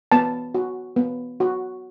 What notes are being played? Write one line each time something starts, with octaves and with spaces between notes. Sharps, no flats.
B3 A5
F#4
B3
F#4